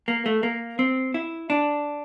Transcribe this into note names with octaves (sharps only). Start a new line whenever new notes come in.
A#3
A3
A#3
C4
E4
D4